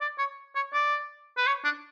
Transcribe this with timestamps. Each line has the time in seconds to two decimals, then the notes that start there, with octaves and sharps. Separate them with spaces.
0.01 D5
0.18 C#5
0.55 C#5
0.73 D5
1.37 B4
1.47 C#5
1.64 D4